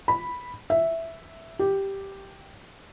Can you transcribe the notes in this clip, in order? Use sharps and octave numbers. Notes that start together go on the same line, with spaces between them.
B5
E5
G4